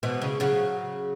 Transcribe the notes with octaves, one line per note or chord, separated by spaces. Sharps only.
B2 E3
C#3
C#3 F#3